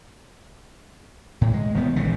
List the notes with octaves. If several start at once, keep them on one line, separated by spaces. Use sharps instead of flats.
A2
G#3
E1 D#3 B3
A#1 C#3 E3